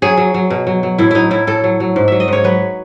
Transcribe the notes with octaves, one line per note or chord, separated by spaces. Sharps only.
F#3 G#4
F#3
F#3
B2
F#3
F#3
A2 E4
F#3 D#4 E4
A2 E4
A2 A4
F#3
F#3
G#2
F#3 E5
D#5
G#2 C#5
F#3 B4